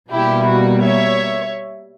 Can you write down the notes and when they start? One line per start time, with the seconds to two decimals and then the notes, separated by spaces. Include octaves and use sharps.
0.12 B2 G3 A#3 E4 G4
0.48 F#4
0.82 C#5 E5